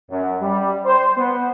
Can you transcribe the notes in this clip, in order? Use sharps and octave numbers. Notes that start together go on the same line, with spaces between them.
F#2
G3
C5
B3